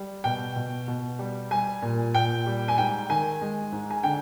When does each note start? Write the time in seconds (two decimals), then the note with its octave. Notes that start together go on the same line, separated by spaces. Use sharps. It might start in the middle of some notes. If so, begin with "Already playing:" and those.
Already playing: G3
0.24 B2 G5
0.56 B2
0.88 B2
1.19 G3
1.51 G3 G#5
1.82 A#2
2.14 A#2 G5
2.46 G3
2.68 G#5
2.78 G#2 G5
3.09 D#3 G#5
3.41 G#3
3.72 G#2
3.91 G#5
4.04 D3 G5